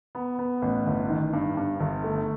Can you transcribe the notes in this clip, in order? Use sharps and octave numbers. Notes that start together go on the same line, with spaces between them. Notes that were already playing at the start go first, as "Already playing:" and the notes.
B3
B3
A1
G1
D#3
G2
G2
G1
A3